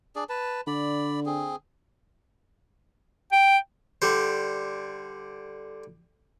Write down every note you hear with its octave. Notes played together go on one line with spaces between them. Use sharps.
D4 G#4 D5
B4 A5
D3 D5 B5
C4 G#4
G5
D3 G3 C5